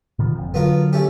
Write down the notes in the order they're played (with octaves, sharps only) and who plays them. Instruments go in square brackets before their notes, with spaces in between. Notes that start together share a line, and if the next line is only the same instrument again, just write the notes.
[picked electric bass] B2 D#3 F3
F#1 F2
[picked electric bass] D3 F#3 [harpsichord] B3 F4 A#4
[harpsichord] A3 C#4 G4